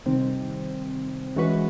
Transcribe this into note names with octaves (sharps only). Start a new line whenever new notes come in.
C3 D#3 G3 C4
E3 G#3 C#4 F#4 B4